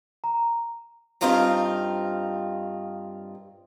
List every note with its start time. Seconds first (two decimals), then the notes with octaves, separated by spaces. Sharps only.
0.24 A#5
1.21 G2 C4 D#4 F4 A#4 A#5